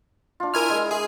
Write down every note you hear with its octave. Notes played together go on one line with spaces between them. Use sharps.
D4 F4
E4 A#4 G#5 F6
G#3 G#4
G#3 G#4